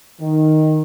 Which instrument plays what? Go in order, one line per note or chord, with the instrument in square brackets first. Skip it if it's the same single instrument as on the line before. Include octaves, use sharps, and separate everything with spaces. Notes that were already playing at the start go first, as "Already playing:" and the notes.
[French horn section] D#3